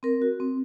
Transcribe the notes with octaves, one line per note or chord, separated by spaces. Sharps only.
C4 A#4
F#4
C4